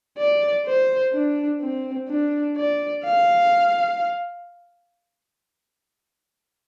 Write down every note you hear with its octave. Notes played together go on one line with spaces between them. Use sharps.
D5
C5
D4
C4
D4
D5
F5